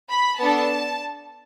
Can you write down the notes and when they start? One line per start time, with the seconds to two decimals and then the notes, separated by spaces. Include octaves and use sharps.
0.10 B5
0.40 B3 D4 A4 A5